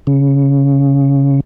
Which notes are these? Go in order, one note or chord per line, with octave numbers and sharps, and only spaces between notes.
C#3